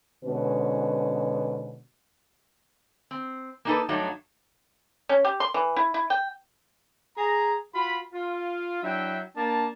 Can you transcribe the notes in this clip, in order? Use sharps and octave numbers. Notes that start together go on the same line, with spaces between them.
G#2 B2 D3 C#4 F#4 B4
C4
A#3 D4 D#4 G4 A4 B4
G2 F#3 A3 D4 D#4
C#4
G4
C6
E3
E4
E4
G5
G#4 A#5
F4 F#4 B5
F4
F#3 D4 E4 E5 G5
A#3 D4 D5 A5